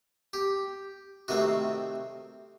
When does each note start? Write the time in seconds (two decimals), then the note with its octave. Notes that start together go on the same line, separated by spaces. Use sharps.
0.33 G4
1.28 C3 D#3 A3 C4 F#4